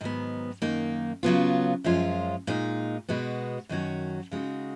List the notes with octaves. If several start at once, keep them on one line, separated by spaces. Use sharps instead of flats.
G#2 D#3 F#3 B3
F#2 D#3 A#3 D#4
C#3 F#3 B3 F4
F#2 F3 G#3 C#4 F4
A#2 G#3 D#4
B2 G#3 B3 F#4
F#2 D#3 F#3 C#4 F#4
C#3 G#3 D#4 F#4